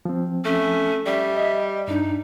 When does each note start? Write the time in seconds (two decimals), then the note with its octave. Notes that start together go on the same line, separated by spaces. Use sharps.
0.05 F3 C4
0.45 A3 C#4
1.06 G3 E5
1.36 D#5
1.88 G2 D4 D#4